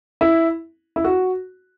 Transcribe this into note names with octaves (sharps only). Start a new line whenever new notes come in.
E4
E4
F#4